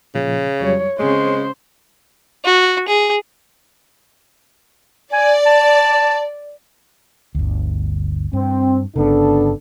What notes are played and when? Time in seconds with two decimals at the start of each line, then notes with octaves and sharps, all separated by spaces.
0.15 A#2 C#3 F3
0.60 F2 F#3 G3 C#5
0.99 C#3 G#3 C4 G#4 C5 C#5
2.45 F#4
2.88 G#4
5.13 D5 G#5
5.46 A5
7.35 G1 D2
8.33 G2 C4
8.96 G1 C#3 B3 D4 A4